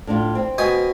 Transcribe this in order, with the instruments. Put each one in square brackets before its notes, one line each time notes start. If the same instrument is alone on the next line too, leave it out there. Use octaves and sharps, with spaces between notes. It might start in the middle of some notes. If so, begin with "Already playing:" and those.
[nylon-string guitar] A2 D4 F4
C4
[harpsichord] B2 G#5 D#6